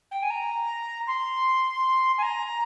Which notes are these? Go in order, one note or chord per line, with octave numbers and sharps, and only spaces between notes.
G5
G#5
A#5
C6
G#5
A#5